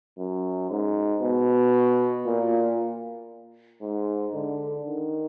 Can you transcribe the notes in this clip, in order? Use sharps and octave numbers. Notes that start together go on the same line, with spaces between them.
F#2
G#2
B2
A#2
G#2
D3
D#3